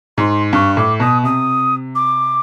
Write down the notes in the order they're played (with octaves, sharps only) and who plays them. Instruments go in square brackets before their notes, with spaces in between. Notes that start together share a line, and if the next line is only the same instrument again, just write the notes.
[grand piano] G#2 [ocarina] C6
[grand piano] G2 [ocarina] C#6
[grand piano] A2 [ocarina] D6
[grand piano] B2 [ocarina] D#6
[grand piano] C3 [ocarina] D#6
[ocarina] D6